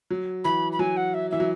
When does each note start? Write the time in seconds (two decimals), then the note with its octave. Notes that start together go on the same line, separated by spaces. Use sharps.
0.10 F#3
0.44 E3 B5
0.72 B5
0.79 F#3 G#5
0.97 F#5
1.14 E5
1.31 E3 E5
1.40 F#3